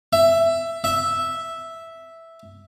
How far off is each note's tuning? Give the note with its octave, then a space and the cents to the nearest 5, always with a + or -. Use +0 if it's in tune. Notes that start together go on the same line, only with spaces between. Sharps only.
E5 +10
E5 -5